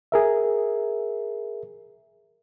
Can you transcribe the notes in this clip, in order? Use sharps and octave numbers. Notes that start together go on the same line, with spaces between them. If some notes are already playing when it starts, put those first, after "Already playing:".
G#4 A#4 E5